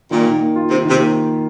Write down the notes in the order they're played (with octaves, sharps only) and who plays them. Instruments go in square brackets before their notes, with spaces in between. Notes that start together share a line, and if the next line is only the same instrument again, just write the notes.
[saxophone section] A#2 [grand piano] D#3
[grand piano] D#3
A#3
F4
[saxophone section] C3 [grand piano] D#3
[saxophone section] C3 [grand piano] D#3
[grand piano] A#3